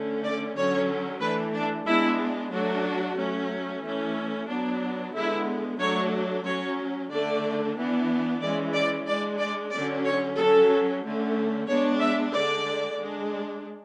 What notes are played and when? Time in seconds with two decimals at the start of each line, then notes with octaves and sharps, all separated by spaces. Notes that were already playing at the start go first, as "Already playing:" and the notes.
Already playing: D3 A3 C#4
0.23 D5
0.56 D3 F#3 C#4 C#5
1.20 E3 A3 D4 B4
1.53 D4
1.86 G#3 B3 D4 E4
2.52 F#3 A3 D4 F#4
3.17 F#3 A3 C#4
3.82 E3 A3 C#4
4.48 F#3 B3 D4
5.14 D3 G#3 B3 E4
5.78 F#3 A3 D4 C#5
6.45 F#3 C#4 C#5
7.10 D3 A3 D4 D5
7.76 E3 B3 D4
8.40 E3 G#3 C#4 D5
8.74 D5
9.07 G#3 D4 D5
9.39 D5
9.71 D3 F#3 C#4 D5
10.05 C#5
10.37 F#3 C#4 A4
11.03 D3 A3 C#4
11.67 G#3 B3 D4 C#5
12.00 E5
12.33 D3 G#3 D4 D5
12.99 G#3 D4